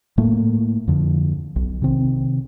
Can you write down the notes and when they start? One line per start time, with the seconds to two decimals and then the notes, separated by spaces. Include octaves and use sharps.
0.18 A2 A3 A#3
0.87 F2 D3 F3
1.56 B1
1.82 C3 D#3 C4